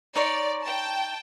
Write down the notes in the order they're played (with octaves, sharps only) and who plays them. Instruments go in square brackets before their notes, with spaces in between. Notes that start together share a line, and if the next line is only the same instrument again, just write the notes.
[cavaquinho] D#4 C#5 C6 [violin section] D5
[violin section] G5 A5